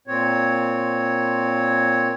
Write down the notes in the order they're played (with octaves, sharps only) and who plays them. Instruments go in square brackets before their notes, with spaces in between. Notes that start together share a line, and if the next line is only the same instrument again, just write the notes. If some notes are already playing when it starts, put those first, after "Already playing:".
[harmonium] A#2 C4 C#5